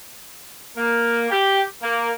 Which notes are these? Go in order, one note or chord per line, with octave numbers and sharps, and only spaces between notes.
A#3
G4
A#3